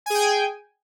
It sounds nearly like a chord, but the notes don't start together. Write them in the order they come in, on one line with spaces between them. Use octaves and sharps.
G#5 G#4 G5